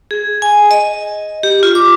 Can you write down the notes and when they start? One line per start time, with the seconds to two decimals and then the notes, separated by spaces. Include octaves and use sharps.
0.11 G#4
0.42 G#5
0.71 D#5
1.43 G4
1.63 F4
1.75 D6